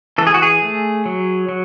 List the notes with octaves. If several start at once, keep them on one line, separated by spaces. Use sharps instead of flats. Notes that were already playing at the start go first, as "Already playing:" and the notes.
E3 A4
G#4
F#4
G#4
A3
F#3
F#3